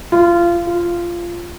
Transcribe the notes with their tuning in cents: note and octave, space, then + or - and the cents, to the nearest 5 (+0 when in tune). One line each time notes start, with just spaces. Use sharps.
F4 -25
F4 -15